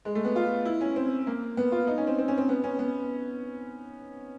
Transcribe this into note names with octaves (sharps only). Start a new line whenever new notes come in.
G#3
A3
B3
F4
E4
C#4
C4
A#3
B3
F4
D#4
C#4
C4
C4
C#4
C4
B3
C#4
B3